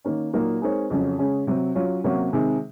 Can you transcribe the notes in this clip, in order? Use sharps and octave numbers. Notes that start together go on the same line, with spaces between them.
D#3 A#3 C#4
A#2 F#3 A#3 D#4 A#4
G#3 C4 D#4 A#4 C#5
F2 C#3 F#3 C#4
C#3 G#3 C#4
C3 F#3 C4
F#3 C#4 F4
C3 F#3 A#3 C#4 F#4
C3 D#3 G#3